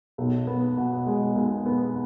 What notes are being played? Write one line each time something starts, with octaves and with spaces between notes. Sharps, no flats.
B1
B3
B2
G#3
B1
B3